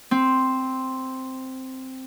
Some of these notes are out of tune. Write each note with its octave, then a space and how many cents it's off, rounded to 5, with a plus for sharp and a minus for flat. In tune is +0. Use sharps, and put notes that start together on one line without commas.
C4 +0